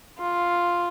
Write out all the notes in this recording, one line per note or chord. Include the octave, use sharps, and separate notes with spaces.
F4